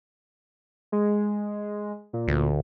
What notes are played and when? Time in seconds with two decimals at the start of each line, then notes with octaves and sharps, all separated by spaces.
0.92 G#3
2.13 A#2
2.28 D2